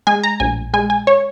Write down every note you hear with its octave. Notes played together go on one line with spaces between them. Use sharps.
G#3 G#5
A#5
A#1 G#5
G#3 G#5
G#5
C#5